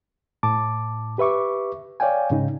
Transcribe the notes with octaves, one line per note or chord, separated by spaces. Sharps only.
A2 A5 D6
G4 B4 E5 C#6 D6
C#5 D5 F5 G5 G#5
G#2 C#3 D#4